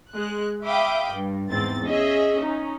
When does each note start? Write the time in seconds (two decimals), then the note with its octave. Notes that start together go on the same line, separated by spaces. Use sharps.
0.12 G#3 F#6
0.65 E5 F5 G5 B5 D6 D#6
1.10 G2
1.49 E2 G#2 C4 A6
1.85 C#4 G#4 D#5 E5
2.42 C#4 D#4